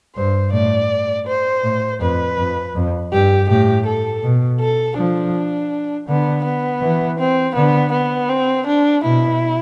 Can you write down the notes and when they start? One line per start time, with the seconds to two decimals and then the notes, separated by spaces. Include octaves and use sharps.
0.16 G2 C5
0.53 A2 D5
1.27 C5
1.64 A2
2.01 F2 B4
2.38 F2
2.75 F2
3.12 G2 G4
3.49 A2 G4
3.86 A4
4.23 B2
4.60 A4
4.97 F3 D4
6.08 D3 B3
6.45 B3
6.82 E3
7.18 C4
7.56 D3 B3
7.92 B3
8.29 C4
8.67 D4
9.04 B2 E4